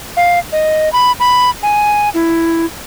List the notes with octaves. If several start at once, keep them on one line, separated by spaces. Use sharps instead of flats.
F5
D#5
B5
B5
G#5
E4